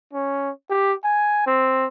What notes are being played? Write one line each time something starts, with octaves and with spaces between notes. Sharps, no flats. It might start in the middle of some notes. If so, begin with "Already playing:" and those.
C#4
G4
G#5
C4